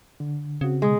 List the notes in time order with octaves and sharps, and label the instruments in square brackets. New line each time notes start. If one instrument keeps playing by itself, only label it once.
[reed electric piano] D3
[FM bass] C#3 [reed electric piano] C4 F#4
[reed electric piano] B2 D#6 [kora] G#3